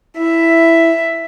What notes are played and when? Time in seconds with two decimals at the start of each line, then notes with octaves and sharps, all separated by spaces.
0.17 E4 E5